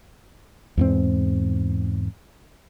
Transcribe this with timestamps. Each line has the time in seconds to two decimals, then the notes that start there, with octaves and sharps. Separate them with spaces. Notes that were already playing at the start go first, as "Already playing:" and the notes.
0.77 E2 G#2 C4